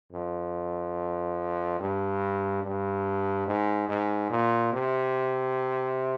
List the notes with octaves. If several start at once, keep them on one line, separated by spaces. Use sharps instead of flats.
F2
G2
G2
G#2
G#2
A#2
C3